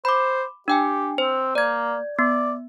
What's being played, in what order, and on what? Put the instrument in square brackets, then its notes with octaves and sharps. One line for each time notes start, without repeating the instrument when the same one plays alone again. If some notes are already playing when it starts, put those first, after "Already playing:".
[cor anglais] C5 [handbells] B5 D6
[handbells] D4 G5 G#5 [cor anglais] G4
[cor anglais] C4 [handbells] C5
[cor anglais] A#3 [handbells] D5 G#6
[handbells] B3 [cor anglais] D5